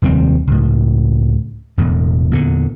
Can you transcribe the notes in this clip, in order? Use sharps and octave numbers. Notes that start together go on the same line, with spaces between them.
F1 D#2 G3 C4
C#2 A2
E1 E2 A2
E2 A#2 D3